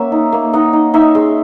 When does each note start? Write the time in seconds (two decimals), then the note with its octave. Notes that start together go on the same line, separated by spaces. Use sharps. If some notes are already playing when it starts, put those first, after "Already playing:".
Already playing: A#3 C#4 C#5 E5 F#5
0.12 D#4
0.32 A#3
0.53 D#4 D#5 F#5
0.73 D#4
0.94 D#4 C#5 E5
1.15 G#3